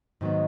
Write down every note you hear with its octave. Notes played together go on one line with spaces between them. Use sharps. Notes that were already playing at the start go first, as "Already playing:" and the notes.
G#2 D#3 F#3 B3